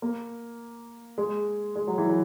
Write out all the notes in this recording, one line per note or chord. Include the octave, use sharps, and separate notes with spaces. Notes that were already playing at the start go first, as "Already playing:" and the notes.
A#3
G#3
G#3
F#3
E3
F#3